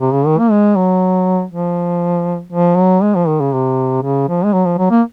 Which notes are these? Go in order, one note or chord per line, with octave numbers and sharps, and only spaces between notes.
C3
C#3
D#3
A#3
G#3
F#3
F3
F3
F#3
G#3
F3
D#3
C#3
C3
C#3
F3
G#3
F#3
F3
F#3
A#3